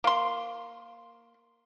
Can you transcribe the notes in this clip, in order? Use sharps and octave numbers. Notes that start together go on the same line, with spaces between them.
A#3 C6